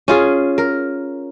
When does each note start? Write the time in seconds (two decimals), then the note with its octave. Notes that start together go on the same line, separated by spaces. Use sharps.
0.08 C#4 F4 G#4
0.58 A#4